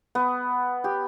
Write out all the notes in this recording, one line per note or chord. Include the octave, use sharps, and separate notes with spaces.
B3
G4